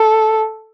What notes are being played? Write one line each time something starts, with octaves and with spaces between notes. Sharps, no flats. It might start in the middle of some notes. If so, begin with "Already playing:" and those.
Already playing: A4